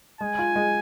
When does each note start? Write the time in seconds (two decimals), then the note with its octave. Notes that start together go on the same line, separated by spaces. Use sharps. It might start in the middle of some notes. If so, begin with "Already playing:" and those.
0.21 G#3 G#5
0.39 F4
0.56 G#3